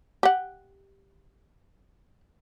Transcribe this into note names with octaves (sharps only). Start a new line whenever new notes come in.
G4 F#5